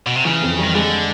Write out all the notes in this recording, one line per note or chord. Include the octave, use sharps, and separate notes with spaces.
B2
C3
C#3 E3
F2
D#3 G3
D3 G#3